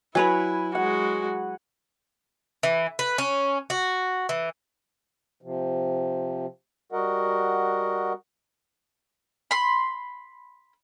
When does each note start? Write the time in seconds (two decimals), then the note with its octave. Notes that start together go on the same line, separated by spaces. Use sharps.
0.15 F#3 E4 B4 C#5 G#5 B5
0.75 G#3 F#4 F#5
2.63 E3
2.99 B4
3.18 C#4
3.70 F#4
4.29 E3
5.42 C3 F3
6.92 G3 F#4 A#4 D#5 F#5
9.51 B5 C6